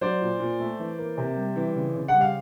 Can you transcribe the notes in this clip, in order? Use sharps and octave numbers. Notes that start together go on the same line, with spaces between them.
F#3 C5 D5
A#2
A#2
A3
E3
A#3
C3
G3
E3
C#3
C#3
F#5
G3
F5